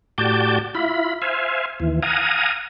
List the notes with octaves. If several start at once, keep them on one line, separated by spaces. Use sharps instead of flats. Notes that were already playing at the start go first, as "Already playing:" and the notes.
A2 F#4 G4 D5 A5 G6
E4 F4 B5
C5 E5 F5 G#5
D#2 E3
F5 F#5 G#5 A#5 D#6